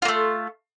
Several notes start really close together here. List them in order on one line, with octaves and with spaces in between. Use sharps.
F4 A#3 A3